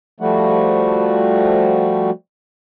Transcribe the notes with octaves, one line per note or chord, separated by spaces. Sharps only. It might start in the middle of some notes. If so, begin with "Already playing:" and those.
F3 G3 A3 F#4